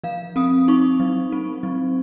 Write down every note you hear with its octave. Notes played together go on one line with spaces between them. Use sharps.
F3 F5
C4 D#6
D#4 C#6
F#3
C4
F#3